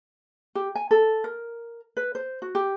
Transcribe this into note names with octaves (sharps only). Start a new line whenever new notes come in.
G4
G#5
A4
A#4
B4
C5
F#4
G4